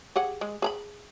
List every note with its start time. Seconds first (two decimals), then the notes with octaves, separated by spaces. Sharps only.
0.16 G4 G#4 F#5
0.41 G#3
0.62 G#4 A#5 B5